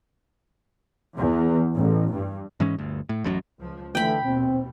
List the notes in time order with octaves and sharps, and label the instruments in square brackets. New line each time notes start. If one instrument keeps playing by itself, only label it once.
[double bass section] E2
A1
G2
[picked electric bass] G#2 E3 G#3 C#4
G1 D2
A2
A1 F#2 D3 F#3
[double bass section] C#2 F3
[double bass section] D3 F3 [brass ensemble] E3 A3 [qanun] G5 B5
[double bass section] A#1 D#2 B2 [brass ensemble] C4